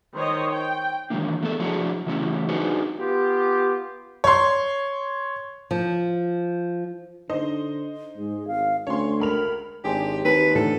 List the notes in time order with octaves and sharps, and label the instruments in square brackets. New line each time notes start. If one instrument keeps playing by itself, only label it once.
[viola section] D#3 C5 C#5 D#5
G5
[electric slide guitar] D#3 E3 F#3 G#3 A#3 D4
A3 B3 D4 G#4 A4
F3 F#3 D4 E4 F#4 G#4
C#3 E3 F#3 A3 C#4 E4
D4 D#4 F#4 G#4 B4 C5
[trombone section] B3 F4 G4
[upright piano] C#5 C6
[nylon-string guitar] F3
[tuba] D3 [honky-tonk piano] D#4 C5 D#5
[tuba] G#2 [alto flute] G#4
[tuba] G#1 [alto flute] F5
[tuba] D2 [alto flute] C#4 [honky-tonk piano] C#5 C6
[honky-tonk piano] C#2 B5 F7 [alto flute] A#4
[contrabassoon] G#1 [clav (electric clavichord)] D4 G#4 C5 [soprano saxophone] G4
[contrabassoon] D#2 [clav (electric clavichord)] C4 [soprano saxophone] B4
[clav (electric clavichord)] A2 D3 E3 [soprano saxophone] A4